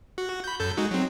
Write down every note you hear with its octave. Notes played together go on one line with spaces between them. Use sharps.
F#4
B5 G6
F#2 A4 G6
G#3 D#4 F#4
F#3 C4